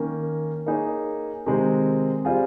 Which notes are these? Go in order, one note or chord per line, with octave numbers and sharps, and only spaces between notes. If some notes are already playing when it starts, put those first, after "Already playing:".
Already playing: D#3 A#3 C#4
A#3 D#4 G#4 C#5
C3 D#3 G#3 C4
G3 C4 F4 G#4